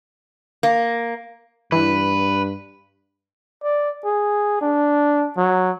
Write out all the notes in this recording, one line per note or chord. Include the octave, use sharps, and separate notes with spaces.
A#3
G2 E3 B4
D5
G#4
D4
F#3